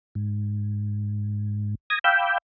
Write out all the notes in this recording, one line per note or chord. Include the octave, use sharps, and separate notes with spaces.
G#2
D#6 G#6 A#6
F5 G5 B5 D6 E6 G6